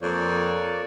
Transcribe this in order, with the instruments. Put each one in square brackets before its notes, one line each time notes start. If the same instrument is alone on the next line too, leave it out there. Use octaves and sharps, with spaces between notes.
[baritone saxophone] F2 [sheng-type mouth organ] A#3 C#5 D5